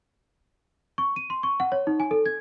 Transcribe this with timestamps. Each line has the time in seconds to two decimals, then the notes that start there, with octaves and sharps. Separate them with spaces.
0.98 C#6
1.16 D#7
1.30 C6
1.43 C#6
1.60 F#5
1.72 C#5
1.87 D#4
2.00 G#5
2.11 A4
2.26 G#6